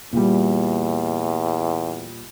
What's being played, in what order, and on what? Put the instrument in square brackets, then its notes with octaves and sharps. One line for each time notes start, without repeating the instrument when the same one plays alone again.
[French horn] E2 [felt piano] A#2 G3